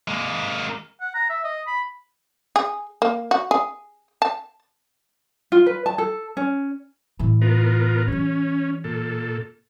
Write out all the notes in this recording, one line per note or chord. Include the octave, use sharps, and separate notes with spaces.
G#3 A#3
F#5
A#5
E5
D#5
B5
G#4
A#3
F#4
G#4
A5
F4
B4
A5
A4
C#4
A2 E3
B3 F4 A#4
E3 G3 C#4
A#2 A4